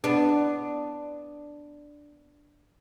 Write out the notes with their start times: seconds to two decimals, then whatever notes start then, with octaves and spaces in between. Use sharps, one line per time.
0.04 B3 D4